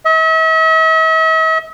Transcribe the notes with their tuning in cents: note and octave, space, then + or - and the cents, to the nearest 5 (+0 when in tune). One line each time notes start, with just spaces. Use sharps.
E5 -45